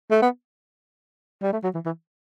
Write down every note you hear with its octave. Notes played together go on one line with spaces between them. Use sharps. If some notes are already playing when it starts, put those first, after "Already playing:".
A3
B3
G3
A3
F#3
E3
E3